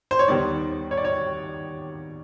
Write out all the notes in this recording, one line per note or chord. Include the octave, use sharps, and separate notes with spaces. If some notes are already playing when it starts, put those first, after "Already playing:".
C5
C#5
D#2 D#3 G3 B3 D#4 D5
C#5
D5
C#5